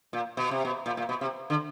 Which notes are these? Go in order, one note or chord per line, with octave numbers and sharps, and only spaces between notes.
A#2
B2
C3
B2
A#2
A#2
B2
C3
D3